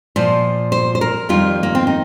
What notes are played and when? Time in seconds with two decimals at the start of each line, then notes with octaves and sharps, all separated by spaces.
0.16 A#2 F3 C5
0.72 C5
0.95 C5
1.01 A#4
1.29 F2 D#3 G3 F4
1.63 A#3
1.75 C4
1.87 D#4